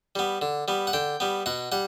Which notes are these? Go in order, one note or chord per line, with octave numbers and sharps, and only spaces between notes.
G3 B3
D3
G3 B3
F#5
D3 G5
G3 B3
B2 F#5
G3 F#5